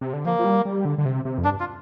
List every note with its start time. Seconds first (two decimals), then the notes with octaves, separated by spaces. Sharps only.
0.01 C3
0.13 D3
0.25 F3 A#3
0.39 F3
0.45 G3
0.65 G3
0.85 D3
0.98 D3
1.05 C3
1.25 C3
1.38 F2
1.45 G2 D4
1.60 F4